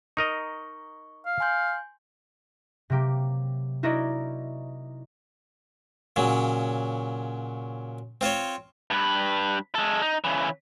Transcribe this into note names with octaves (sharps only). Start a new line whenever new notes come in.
D#4 A#4 D#5 C#6
F5
G#5 C6 G6
C3 F#3 A#3 G4
D#4 E4 F#4 A#4 D5 D#5
A#2 C#3 F#3
C4 F4 C5 C#5
G2 B4
G#3 A4
D#4
C#3 E3